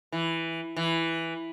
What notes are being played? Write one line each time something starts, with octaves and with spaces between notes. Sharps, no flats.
E3
E3